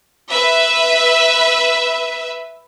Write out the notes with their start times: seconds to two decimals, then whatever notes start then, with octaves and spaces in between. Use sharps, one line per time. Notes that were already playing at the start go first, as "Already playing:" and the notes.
0.32 B4 E5